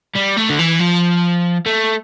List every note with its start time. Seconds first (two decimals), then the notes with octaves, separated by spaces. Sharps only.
0.16 G3
0.37 A3
0.50 D3
0.59 E3
0.79 F3
1.66 A3